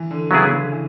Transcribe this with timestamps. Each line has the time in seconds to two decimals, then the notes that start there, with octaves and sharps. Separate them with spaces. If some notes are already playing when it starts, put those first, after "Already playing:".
Already playing: E3
0.11 D3
0.31 C#3 F#3 B3 E4 G#4
0.51 D3
0.72 E3